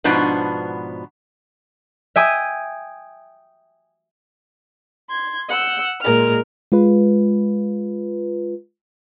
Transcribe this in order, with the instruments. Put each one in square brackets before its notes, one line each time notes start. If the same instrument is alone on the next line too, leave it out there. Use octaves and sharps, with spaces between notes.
[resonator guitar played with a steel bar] G#2 B2 F3 B3 D4
[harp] E5 G5 G#5 D#6
[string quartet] C6 G#6
F#5 E6 G6
A#2 G#3 A#4 F6
[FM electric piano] G#3 F4 B4